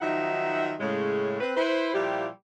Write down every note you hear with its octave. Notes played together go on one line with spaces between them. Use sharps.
D#3 F3 F#3 D#4 E5 F#5
A2 C#3 G#3
C4 B4
E4 B4 C5
A#2 F3 G3 E4 G4